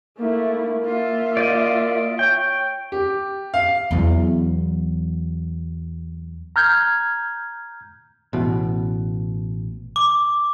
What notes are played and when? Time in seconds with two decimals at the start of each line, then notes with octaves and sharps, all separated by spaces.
0.19 A3 A#3 E4
0.86 F4 E5
1.37 D5 D#5
2.19 C#5 G5
2.92 G4
3.54 F5
3.91 E2 F#3
6.56 A#5 F6 G6 G#6
8.33 A1 B2
9.96 D6